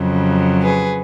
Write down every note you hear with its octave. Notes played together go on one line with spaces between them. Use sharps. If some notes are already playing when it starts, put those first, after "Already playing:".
Already playing: F2 C#3 F#3
G#4 B4